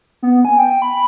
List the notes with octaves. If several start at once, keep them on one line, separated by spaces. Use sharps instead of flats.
B3
G#5
G5
B5